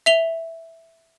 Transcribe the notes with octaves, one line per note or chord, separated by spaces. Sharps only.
E5 F7 G7